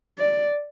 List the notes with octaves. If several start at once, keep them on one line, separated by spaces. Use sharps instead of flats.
D5